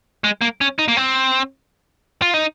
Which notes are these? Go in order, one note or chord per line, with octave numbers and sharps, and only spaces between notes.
G#3
A#3
C#4
D#4
A#3
C4
F4
D#4